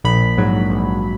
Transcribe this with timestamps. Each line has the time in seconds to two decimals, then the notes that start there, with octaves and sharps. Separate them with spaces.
0.04 A#1 B5
0.38 G#2 F#3
0.70 A#1